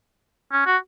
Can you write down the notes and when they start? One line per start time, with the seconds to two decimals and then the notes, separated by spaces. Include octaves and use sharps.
0.52 C#4
0.66 F#4